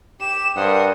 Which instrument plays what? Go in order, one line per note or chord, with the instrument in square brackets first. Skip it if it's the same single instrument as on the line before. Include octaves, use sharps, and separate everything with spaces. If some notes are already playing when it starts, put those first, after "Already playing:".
[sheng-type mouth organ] G4 [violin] E7
[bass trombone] G2 [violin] A#4 C5 [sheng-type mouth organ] F#5 D#6